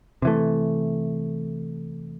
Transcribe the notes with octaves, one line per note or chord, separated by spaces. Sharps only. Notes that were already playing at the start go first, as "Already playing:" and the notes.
C3 E3 A3